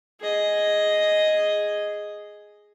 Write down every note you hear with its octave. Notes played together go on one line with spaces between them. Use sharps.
G#4 D#5